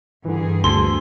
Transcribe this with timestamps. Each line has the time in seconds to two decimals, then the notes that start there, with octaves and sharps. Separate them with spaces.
0.25 G2 D3 E3 G#4
0.64 D2 A4 C6